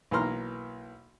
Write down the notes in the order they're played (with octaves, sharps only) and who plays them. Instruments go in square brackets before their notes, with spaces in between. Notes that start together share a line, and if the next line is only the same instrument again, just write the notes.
[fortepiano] B1 E3 A#3 A#5 C6 F6